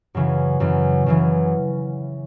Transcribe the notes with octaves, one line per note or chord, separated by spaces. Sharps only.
F#2 C#3 E3
F#2 C#3 E3
F#2 C#3 E3